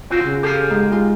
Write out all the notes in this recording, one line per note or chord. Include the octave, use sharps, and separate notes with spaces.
C4 F4 F#4 C5
C#3
G4 A4 C5 F5
G#2
G#3 F4